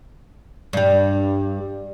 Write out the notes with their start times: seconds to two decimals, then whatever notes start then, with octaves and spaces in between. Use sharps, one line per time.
0.73 G2 G3